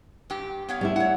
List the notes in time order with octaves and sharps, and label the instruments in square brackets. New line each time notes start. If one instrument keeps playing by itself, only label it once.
[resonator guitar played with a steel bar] G2 G4
B3 C#5 F5
[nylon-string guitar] G3 D4 E4
[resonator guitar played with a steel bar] C#5 F#5